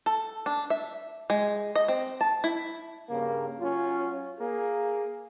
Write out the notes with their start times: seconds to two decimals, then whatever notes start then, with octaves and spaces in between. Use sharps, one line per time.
0.06 A4
0.46 D4
0.70 E5
1.30 G#3
1.76 D#5
1.88 C4
2.21 A5
2.44 E4
3.10 G2 C#3 A#3
3.60 F#3 C#4 F4
4.40 A#3 G#4